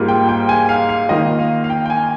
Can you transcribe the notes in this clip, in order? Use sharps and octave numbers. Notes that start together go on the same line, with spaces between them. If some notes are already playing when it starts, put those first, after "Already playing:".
Already playing: G#2 G3 A#3 F4
G5
G5
G#5
F5
F5
D#3 A#3 F4 D#5
F5
F5
G5
G5
G#5